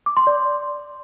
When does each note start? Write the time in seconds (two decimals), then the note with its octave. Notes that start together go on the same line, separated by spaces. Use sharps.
0.06 D6
0.17 C6
0.27 D5